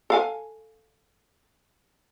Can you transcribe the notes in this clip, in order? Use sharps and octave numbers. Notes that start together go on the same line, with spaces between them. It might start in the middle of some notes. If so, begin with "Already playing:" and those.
A4 F5 G#5